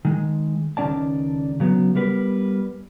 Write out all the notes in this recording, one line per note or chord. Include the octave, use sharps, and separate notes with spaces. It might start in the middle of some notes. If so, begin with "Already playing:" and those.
D#3 G#3
C#2 D#3 F#3 C#4 D5 A5
C#3 F#3 B3
G3 B3 A#4 B4